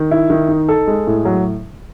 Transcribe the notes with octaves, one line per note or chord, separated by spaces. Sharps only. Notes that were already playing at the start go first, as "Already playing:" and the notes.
Already playing: D#3
E4
D#3
D#4
A4
G#3
A2
F#3